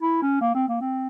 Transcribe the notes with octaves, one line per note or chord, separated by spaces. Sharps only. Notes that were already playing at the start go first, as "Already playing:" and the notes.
E4
C#4
A#3
C4
A#3
C4